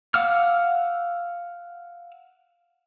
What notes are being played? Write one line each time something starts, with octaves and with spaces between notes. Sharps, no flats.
F5 F#5 D6 E6 F6